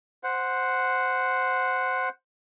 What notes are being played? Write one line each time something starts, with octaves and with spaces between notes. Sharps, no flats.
C5 F#5